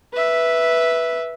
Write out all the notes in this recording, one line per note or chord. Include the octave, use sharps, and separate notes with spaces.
B4 E5